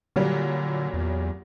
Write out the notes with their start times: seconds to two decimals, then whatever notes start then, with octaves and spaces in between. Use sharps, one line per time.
0.16 A#2 D3 F#3 G3
0.94 E2